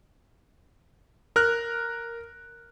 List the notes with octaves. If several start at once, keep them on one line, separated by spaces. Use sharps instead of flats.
A#4 F6 F#6